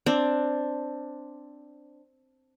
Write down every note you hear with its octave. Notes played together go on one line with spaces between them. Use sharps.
C4 D4